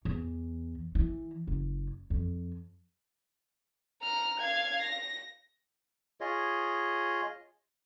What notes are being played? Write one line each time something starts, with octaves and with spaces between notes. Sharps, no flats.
E2
E3
F#1
F2
A#5 F6
F5 G#6
A#6
F4 G#4 C#5 D#5